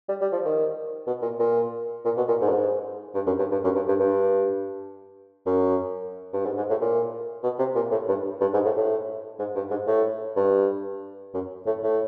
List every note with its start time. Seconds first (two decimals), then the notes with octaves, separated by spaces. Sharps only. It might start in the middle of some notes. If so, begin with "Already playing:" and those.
0.09 G3
0.21 G3
0.32 F3
0.45 D#3
1.07 B2
1.22 A#2
1.39 A#2
2.05 A#2
2.17 B2
2.28 A#2
2.41 G#2
2.49 G2
2.53 G#2
3.15 G2
3.26 F#2
3.38 G2
3.51 G2
3.64 F#2
3.75 G2
3.88 G2
4.00 G2
5.46 F#2
6.33 G2
6.45 G#2
6.57 G#2
6.70 A2
6.81 A#2
7.43 B2
7.59 C3
7.75 A#2
7.91 A2
8.08 G2
8.41 G2
8.53 G#2
8.65 A2
8.77 A2
9.39 G#2
9.55 G2
9.70 G#2
9.87 A2
10.36 G2
11.34 F#2
11.66 A2
11.83 A2